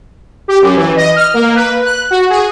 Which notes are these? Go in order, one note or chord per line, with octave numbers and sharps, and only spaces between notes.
G4
F#2
E3
D#5
F6
A#3
B4
F#6
F#4
G#4